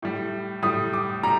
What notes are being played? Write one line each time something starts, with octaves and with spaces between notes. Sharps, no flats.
A2 G3
A2 G3 D#6
D6
G3 A#5